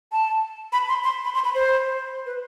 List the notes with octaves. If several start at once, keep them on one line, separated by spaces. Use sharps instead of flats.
A5
B5
C6
C6
B5
C6
B5
C5
B4